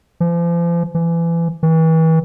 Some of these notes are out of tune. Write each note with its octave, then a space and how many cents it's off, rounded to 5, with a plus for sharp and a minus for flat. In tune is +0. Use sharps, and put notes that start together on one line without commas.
F3 -40
E3 +30
E3 -35